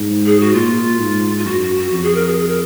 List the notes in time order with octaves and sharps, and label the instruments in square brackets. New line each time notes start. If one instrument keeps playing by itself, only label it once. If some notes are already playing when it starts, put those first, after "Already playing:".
Already playing: [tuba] G#2
[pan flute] G#4
F#4
[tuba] A#2 [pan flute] F4
[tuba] G#2
[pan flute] F4
[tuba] F#2 [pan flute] F#4
[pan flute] F#4
F#4
[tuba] F2 [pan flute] F#4
[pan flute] G#4
A#4
G#4
G#4
A#4